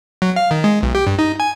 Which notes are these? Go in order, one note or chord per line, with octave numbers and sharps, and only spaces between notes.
F#3
F5
D#3
G#3
B1
G4
G2
D#4
G#5